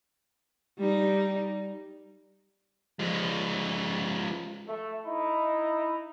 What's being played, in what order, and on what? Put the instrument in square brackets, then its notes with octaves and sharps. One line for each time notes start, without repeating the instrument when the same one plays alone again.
[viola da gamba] G3 D#4
[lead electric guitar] F3 G#3
[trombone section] A3
D#4 E4